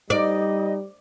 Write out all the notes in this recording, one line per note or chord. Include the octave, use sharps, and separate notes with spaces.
G3 D#4 D5 D#5